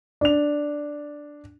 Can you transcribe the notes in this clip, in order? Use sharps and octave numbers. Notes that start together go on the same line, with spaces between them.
D4 F7